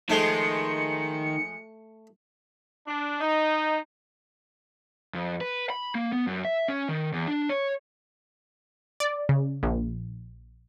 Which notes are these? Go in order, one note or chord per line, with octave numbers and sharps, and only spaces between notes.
D#3 F3 G#3 A3 C#7
D4
D#4
F2
B4
B5
A#3
B3
F#2
E5
C#4
D#3
E2
D4
C#5
D5
C#3
A#1